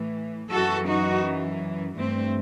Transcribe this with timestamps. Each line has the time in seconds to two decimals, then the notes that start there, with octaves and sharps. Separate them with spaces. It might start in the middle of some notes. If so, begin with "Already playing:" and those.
Already playing: A2 E3
0.51 F#2 E3 F#4 A4
0.88 D#4 F#4
1.97 G2 E3 A3 C4